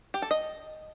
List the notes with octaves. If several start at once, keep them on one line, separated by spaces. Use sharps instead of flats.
G4
A4
D#5